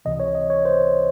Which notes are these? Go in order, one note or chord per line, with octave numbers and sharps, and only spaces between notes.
C#2 C3 E3 D#5
C#5
D#5
C#5
C5